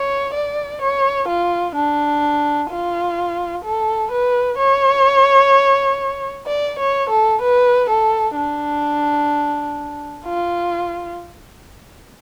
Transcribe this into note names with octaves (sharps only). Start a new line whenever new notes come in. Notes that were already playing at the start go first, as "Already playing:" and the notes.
Already playing: C#5
D5
C#5
F4
D4
F4
A4
B4
C#5
D5
C#5
A4
B4
A4
D4
F4